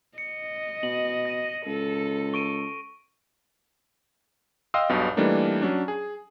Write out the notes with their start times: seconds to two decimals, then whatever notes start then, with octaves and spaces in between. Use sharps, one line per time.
0.18 D#5 C#7
0.83 B2 F#7
1.26 A#6 D#7
1.66 C#2 A4
2.34 C#6 D7 D#7
4.74 D#5 F5 G5 C6 D#6 E6
4.89 B1 G2 B2
5.17 E3 G3 A3 A#3 D4 D#4
5.62 F#3 C#4 D4
5.88 G#4